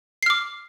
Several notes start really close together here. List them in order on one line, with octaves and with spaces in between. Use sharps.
C7 F6 D6